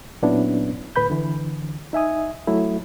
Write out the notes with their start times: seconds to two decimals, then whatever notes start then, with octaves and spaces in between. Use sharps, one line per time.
0.22 A#2 F#3 B3 C#4 D4 E4
0.96 D2 A2 B4 B5 G6
1.10 D3 E3
1.93 D#4 E5 G#5 D#6
2.48 F#3 A3 E4